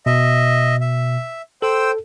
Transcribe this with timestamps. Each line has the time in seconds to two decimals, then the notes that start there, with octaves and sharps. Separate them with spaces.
0.06 B2 D#5 E5
0.81 E5
1.62 A4 C5 G5 E6